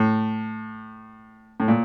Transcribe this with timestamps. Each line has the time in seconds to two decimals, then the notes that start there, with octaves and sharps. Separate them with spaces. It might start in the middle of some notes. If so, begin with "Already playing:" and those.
Already playing: A2
1.60 A2
1.68 A#2